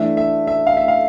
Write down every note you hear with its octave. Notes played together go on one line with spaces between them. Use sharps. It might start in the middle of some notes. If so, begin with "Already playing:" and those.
Already playing: E3 A3 D4 E5
E5
E5
F5
E5
F5